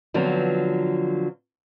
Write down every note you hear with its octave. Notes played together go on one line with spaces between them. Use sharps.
D3 F3 F#3 B3 C4